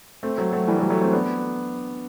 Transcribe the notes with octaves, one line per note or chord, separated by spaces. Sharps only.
A3 C4
F#3 A3
F#3 A3
E3 G3
F#3 A3
F#3 A3
A3 C4
B3 D4